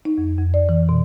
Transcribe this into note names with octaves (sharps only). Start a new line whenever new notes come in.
D#4
F2
F2
D5
E3
B2